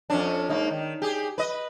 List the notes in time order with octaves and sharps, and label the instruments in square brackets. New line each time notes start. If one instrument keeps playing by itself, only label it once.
[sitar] F2 C#4 D4
G#2 A#3 D#4
D#3
G4 G#4
B4 D#5